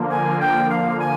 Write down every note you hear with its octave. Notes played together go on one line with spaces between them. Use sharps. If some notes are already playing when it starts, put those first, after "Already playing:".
Already playing: D3 F3 A#3
G#5
G5
F5
G#5